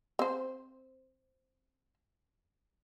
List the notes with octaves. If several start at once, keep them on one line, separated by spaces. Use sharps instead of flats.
C4 C5